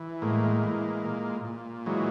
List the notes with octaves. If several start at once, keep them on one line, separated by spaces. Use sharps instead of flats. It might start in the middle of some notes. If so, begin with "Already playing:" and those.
Already playing: E3
A2 G#3 A#3
E3
A#2
A#2
E3 F#3 G#3